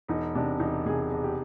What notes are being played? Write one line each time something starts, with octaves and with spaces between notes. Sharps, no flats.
E1 D#4
C3 D4
E1 D#4
C3 G#4
E1
G4